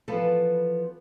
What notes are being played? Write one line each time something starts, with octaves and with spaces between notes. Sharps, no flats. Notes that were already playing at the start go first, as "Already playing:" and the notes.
E3 F3 B3 A4 B4